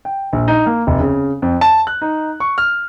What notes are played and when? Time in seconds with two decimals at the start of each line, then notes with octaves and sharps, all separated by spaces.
0.05 G5
0.33 A#1
0.48 D#4
0.66 A#3
0.87 F1
1.00 C#3
1.42 F2
1.61 A5
1.87 F#6
2.02 D#4
2.40 C#6
2.58 F6